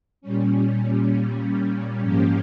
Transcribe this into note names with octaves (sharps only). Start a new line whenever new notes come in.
A#2 G3 C#4
G#2 F3 A#3 C#4 G4